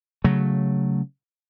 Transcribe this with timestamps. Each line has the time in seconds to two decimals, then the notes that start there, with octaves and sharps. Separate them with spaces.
0.24 C#3 F#3 A3